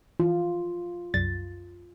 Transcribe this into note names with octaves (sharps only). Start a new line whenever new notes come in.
E3 F4
C2 F#2 A6